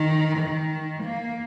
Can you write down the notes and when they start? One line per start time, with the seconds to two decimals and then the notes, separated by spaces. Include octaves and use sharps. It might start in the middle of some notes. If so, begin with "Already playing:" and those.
Already playing: D#3
0.38 D#3
1.04 A#3